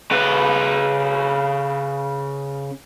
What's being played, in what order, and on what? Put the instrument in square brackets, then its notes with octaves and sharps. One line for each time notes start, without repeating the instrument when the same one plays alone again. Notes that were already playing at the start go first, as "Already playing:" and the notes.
[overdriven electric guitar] C#3 B4